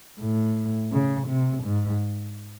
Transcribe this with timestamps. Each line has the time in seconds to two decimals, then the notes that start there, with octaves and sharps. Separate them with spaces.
0.20 A2
0.92 C#3
1.28 C3
1.64 G#2